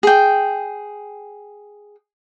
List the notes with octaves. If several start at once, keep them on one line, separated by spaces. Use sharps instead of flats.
G#4 G5